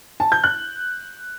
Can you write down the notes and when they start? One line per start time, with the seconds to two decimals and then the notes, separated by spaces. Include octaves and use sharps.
0.20 A5
0.32 G6
0.44 F#6